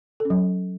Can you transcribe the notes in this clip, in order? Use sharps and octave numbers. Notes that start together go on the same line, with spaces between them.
A4
C#4
F#3